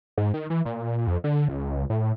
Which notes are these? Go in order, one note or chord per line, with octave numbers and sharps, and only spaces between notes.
G#2
D#3
E3
A#2
F2
D3
C#2
A2